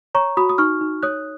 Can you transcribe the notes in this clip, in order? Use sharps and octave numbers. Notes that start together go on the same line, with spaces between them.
C#5 A#5 C#6
F#4 B5 D#6
D#6
D#4 C#6 F6
D#4
C#5 D#6 F#6